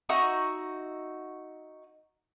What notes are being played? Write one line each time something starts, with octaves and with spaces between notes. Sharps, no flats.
D#4 F#4 E5 C#6